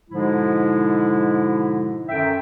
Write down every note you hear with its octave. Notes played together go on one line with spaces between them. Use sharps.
G#2 B2 D3 F3 G#3 E4
F#2 D3 D#3 A4 E5 G5